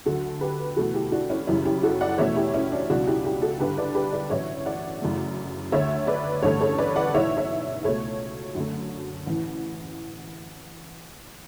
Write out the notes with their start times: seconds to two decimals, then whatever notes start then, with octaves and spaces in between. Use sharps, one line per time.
0.06 D2 D3 F#3 F#4 A4
0.41 G4 B4
0.77 E2 B2 A3 F#4 A4
0.94 E4 G4
1.12 D4 F#4
1.30 C#4 E4
1.47 F#2 C#3 E3 G3 C#4 E4
1.65 E4 G4
1.83 F#4 A4
2.01 D5 F#5
2.18 E2 B2 A3 C#5 E5
2.36 E4 G4
2.54 C#4 E4
2.72 D4
2.90 C#2 B2 F#3 D4 F#4
3.08 E4 G4
3.25 E4 G4
3.42 F#4 A4
3.59 G1 G2 D3 G4 B4
3.77 B4 D5
3.95 G4 B4
4.12 B4 D5
4.30 A1 A2 F#3 C#5 E5
4.66 D5 F#5
5.02 F#2 C#3 E3 A3
5.72 D2 D3 A3 C#5 E5
6.07 B4 D5
6.42 A1 G2 D3 A3 A4 C#5
6.61 A4 C#5
6.78 B4 D5
6.96 D5 F#5
7.14 B1 A2 E3 C#5 E5
7.37 C#5 E5
7.84 C#2 B2 A3 A4 C#5
8.55 F#2 D3 F#3 A3
9.27 A1 A2 E3